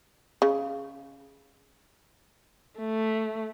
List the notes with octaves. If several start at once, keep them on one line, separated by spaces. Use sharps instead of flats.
C#3
A3